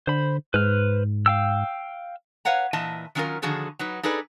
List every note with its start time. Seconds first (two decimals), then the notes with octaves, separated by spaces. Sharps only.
0.07 D3 C5 B5
0.54 G#2 B4 C5 F6
1.26 F5 G5 E6
2.45 B4 C#5 F5 F#5 A#5
2.73 A#2 E3 D#5 E5 A5
3.15 D#3 F#3 C#4 E4 F4 A#4
3.42 D3 D#3 F3 F#4 G#4 A4
3.79 F#3 D#4 B4
4.03 D#4 G#4 A4 B4 D5